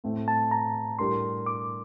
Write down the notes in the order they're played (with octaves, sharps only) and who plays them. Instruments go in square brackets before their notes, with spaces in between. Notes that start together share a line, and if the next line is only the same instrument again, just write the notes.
[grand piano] A2 A3 C4
[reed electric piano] A5
A#5
[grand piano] A2 G3 D4 G4 A#4 [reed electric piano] C6
[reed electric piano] D6